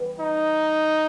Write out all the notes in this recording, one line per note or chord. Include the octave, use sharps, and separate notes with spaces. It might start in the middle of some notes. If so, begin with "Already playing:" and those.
Already playing: E3 G3 B3 D4
D#4